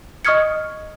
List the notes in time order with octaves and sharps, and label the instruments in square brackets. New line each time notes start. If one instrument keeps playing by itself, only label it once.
[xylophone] D#5 C#6 D#6 F6 G#6 C#7